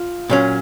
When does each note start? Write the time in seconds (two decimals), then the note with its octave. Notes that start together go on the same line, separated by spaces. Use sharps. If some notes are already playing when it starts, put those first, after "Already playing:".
Already playing: F4
0.30 A#2 F#3 C#4